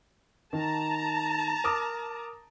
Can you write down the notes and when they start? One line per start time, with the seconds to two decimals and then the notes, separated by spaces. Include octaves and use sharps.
0.53 D#3 A5 A#5
1.64 A#4 D6 D#6